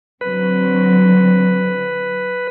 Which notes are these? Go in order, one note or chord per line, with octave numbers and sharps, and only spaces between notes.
D3 F#3 C4 B4